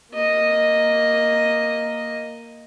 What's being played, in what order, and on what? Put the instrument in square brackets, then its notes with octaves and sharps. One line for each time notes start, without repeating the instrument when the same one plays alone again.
[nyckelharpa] A#3 D#5